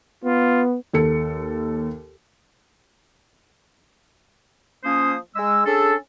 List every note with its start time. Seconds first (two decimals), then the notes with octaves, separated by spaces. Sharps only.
0.24 B3 F4
0.93 D#2 A4 C#7
4.84 F3 A#3 C#4 C5 D#6
5.36 G#3 E6
5.66 C#4 D4 G#4 A4